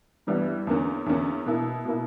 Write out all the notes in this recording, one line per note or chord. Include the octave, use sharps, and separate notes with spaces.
G2 E3 G3 B3
E2 D3 A#3 C#4
E2 D3 A#3 C#4
B2 A#3 E4
B2 A#3 E4